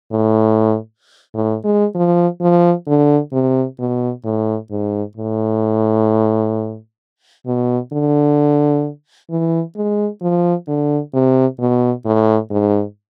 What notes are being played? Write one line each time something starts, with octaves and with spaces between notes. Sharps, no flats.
A2
A2
G#3
F3
F3
D3
C3
B2
A2
G#2
A2
B2
D3
E3
G#3
F3
D3
C3
B2
A2
G#2